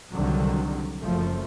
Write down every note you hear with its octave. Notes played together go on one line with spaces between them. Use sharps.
C2 D3 D#3 F#3
F#1 F#2 F3 A3